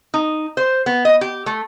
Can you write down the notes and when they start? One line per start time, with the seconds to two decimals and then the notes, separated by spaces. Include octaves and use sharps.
0.14 D#4
0.57 C5
0.86 B3
1.05 D#5
1.21 G4
1.46 A3